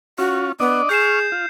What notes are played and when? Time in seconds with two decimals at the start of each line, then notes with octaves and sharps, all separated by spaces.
0.18 C#4 F4 F#4
0.60 B3 D4 D5 D#5
0.89 G#4 C#6 F6 G6 C7 E7
1.32 F4